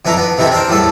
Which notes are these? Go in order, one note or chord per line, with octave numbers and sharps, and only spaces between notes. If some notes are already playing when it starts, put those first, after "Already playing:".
F2 E3 D4 E4 A5 A#5
B3 D4
C3 D#3 E3 C4 E4 A4
C4 D4 A#4 C5
E2 A2 G3 A4 A5